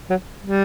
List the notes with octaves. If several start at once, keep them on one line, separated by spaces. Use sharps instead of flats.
F#3
G3